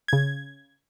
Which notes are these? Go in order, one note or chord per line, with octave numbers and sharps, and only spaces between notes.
C#3 G#6